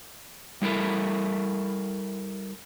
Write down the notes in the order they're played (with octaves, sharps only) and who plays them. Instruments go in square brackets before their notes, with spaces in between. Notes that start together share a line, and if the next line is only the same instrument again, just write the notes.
[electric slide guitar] G3 E4 A4 A#4 E5